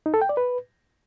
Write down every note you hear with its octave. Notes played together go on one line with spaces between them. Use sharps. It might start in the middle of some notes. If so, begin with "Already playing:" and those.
D#4
A4
G5
D5
B4